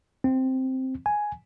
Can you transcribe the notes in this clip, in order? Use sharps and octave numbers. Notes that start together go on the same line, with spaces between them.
C4
G#5